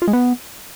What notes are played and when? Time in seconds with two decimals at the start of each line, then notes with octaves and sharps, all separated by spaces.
0.02 F4
0.08 G#3
0.13 B3